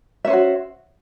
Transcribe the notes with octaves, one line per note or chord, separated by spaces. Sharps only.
C#4 F#4 C5 E5